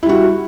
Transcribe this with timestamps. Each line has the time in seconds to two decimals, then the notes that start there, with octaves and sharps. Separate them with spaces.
0.03 E4
0.06 G3
0.09 F#4